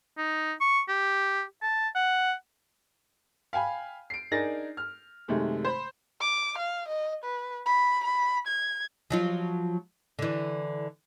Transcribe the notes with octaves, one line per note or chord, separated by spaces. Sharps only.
D#4
C#6
G4
A5
F#5
F5 G5 G#5 B5
C7 D7
D4 D#4 G#4 A#4 A6 A#6
F6
F#2 C3 D#3 G#3 A3
C5 B5
D6
F5
D#5
B4
B5
B5
G#6
F3 F#3 F4
D3 E3